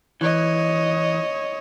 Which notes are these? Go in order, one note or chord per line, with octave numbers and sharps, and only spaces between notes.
E3 C#5 D#5